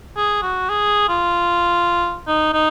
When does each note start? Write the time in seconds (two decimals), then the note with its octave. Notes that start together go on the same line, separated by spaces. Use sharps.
0.17 G#4
0.42 F#4
0.69 G#4
1.08 F4
2.27 D#4
2.53 D#4